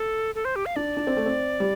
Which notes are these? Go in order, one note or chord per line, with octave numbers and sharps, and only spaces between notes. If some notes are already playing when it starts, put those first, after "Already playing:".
Already playing: A4
A4
C5
G4
F5
D4 D5
D4
C4
A3
C4
G3